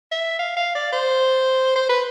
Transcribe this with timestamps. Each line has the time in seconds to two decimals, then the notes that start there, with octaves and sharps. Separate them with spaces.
0.12 E5
0.39 F5
0.57 F5
0.75 D5
0.92 C5
1.76 C5
1.89 B4